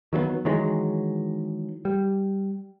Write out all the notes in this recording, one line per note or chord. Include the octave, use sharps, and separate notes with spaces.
D#3 F#3 G#3 B3
D#3 E3 F#3 G#3
G3